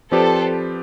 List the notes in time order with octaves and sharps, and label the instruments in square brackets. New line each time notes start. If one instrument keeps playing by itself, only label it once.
[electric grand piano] F3 C4 G4 B4 D5 [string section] A4 C5